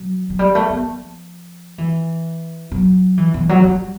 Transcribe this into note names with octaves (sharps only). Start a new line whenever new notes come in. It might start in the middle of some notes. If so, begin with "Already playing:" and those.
Already playing: F#3
F#3
G3
A3
B3
F3
E3
F#3
E3
E3
F#3
G3